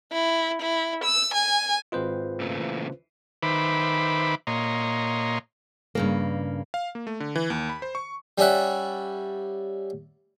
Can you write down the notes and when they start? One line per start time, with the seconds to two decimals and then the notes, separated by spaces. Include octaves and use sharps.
0.12 E4
0.62 E4
1.04 E6
1.34 G#5
1.92 G#1 C4 F4 B4 C5 D#5
2.40 A#2 C#3 A3
2.59 E3
3.43 D#3 B4 C5 E5 B5 D6
4.47 A#2 C#5 D#5 A#5 C6
5.95 G2 C#3 A#3
6.74 F5
6.95 A#3
7.07 A3
7.20 D3
7.35 E3
7.50 D#2
7.69 B5
7.82 C5
7.95 C#6
8.38 G3 C#4 D5 E5 F#5